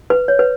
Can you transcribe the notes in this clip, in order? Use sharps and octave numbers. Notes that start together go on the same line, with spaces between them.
B4
C#5
B4